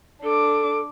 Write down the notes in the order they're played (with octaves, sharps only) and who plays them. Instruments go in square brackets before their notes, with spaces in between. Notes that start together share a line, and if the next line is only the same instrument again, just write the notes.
[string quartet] D4 D6 [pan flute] A4